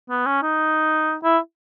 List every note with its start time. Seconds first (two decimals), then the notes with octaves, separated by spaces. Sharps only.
0.10 B3
0.26 C#4
0.42 D#4
1.24 E4